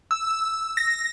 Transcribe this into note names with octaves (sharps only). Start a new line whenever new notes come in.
E6
A#6